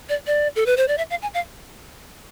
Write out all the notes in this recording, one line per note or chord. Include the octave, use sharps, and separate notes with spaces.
D5
D5
A4
B4
C5
D5
E5
F5
G#5
F5